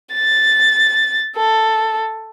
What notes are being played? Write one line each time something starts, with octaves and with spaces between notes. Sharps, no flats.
A6
A4